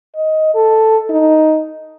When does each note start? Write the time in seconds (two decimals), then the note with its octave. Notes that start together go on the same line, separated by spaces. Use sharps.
0.15 D#5
0.54 A4
1.10 D#4